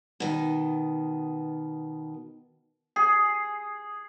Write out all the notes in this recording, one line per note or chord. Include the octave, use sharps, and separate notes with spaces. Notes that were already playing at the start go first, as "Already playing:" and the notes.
B2 D#3
G#4